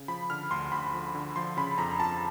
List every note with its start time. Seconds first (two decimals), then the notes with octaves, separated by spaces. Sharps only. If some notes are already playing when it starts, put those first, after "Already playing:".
Already playing: C#3
0.08 F3 B5
0.30 D3 F6
0.51 D2 C6
0.72 D2 B5
0.93 F3
1.15 D3
1.36 F3 C6
1.57 C#3 B5
1.78 F2 A#5
2.00 F2 A5